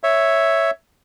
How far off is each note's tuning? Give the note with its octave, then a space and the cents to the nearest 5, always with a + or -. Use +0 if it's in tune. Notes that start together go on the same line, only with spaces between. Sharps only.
C#5 +0 E5 +0